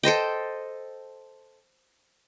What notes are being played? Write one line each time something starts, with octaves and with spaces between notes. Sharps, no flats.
A4 C5 D#5 G5